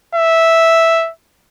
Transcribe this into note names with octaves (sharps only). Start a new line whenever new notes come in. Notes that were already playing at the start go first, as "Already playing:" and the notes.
E5